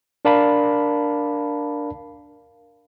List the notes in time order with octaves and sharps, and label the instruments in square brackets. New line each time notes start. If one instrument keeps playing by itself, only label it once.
[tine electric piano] D4 A#4 D5 F5 A5 B5